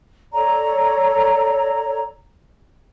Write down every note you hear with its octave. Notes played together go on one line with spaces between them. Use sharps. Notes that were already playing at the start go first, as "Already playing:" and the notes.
A4 C#5 D5 A#5